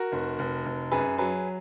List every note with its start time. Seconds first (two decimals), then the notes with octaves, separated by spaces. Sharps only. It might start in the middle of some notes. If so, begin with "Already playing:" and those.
Already playing: F#4 A#4
0.12 F1
0.39 F1
0.66 F1
0.92 F#2 G#4 B4
1.18 F#3 G#4 B4